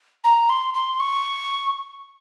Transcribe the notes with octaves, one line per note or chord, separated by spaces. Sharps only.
A#5
C6
C6
C#6